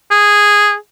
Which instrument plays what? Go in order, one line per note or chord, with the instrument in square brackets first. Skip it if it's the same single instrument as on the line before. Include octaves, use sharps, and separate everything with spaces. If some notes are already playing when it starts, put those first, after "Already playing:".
[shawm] G#4